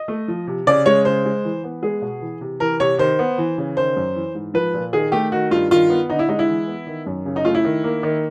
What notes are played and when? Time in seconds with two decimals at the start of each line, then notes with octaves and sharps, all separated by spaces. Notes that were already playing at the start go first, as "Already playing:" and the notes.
Already playing: D#5
0.08 A3
0.28 F3
0.47 C3
0.67 C#3 D5
0.86 G#3 C#5
1.05 C#3 C5
1.25 G#3
1.45 E3
1.64 B3
1.83 G#3 G#4
2.02 B2
2.22 E3
2.41 C3
2.60 E3 A#4
2.80 C3 C#5
2.99 D#3 C5
3.19 B3
3.38 E3
3.58 C#3
3.77 D#3 C5
3.96 F#2
4.16 E3
4.35 G#2
4.54 F3 B4
4.74 A#2
4.93 D#3 G#4
5.12 A3 G4
5.32 D#3 F#4
5.51 G2 F4
5.71 D#3 F4
5.90 B3
6.10 D3 D#4
6.19 E4
6.29 G#3 D#4
6.39 E4
6.48 E3
6.67 B3
6.87 D#3
7.06 F#2
7.26 C#3
7.36 D#4
7.45 A3 F4
7.55 E4
7.64 D#3
7.84 A#3
8.03 D#3